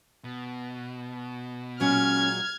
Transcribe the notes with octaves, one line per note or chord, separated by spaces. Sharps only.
B2
A#2 F#3 G#3 C#4 F6 G#6